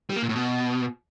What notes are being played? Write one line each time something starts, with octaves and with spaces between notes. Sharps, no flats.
G3
A#3
A#2
A2
B2